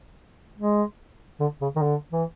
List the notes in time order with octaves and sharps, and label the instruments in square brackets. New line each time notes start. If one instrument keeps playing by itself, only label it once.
[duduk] G#3
D3
C#3
D#3
D3
E3